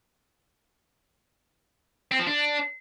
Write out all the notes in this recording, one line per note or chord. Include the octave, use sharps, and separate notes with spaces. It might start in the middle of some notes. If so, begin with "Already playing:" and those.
C4
F3
D4